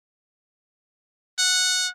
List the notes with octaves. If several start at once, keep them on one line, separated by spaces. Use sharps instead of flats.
F#5